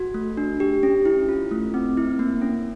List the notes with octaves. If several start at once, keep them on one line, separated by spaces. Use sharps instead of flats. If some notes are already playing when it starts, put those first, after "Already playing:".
Already playing: F#4
A3
D4
G4
C#4
E4
F4
A3
C4
E4
A#3
C#4